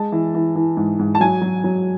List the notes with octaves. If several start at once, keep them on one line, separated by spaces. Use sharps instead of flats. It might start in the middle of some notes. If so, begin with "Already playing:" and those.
Already playing: G#3 A5
E3
E3
E3
G#2
G#2
A5
F#3 G#5
F#3
F#3